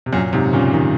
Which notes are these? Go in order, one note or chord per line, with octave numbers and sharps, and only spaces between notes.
C3
F#2 A#2
G#2 C3
A#2 C#3
C3 D#3